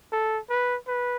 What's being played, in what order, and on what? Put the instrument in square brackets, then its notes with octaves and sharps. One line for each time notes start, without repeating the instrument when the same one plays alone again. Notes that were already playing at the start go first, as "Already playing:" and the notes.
[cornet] A4
B4
B4